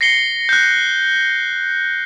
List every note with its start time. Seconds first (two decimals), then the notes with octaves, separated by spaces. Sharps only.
0.01 A#6 C7 C#7 G7
0.49 F#6 G6